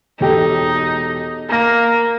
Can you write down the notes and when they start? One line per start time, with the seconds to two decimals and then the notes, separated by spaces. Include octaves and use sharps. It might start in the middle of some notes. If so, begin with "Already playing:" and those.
0.20 E1 D#4 G4 A4
1.49 A#3 A#5 A#6